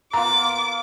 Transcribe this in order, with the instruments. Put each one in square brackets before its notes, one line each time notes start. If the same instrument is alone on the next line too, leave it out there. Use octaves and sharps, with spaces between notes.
[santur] A#3 B3 F4 [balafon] A#5 [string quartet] D6